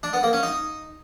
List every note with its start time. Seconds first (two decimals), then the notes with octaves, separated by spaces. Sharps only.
0.03 D4
0.13 B3
0.23 A#3
0.33 C#4
0.43 D#4